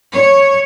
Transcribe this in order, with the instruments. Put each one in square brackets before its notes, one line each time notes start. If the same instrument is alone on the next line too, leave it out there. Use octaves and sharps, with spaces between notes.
[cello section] C#5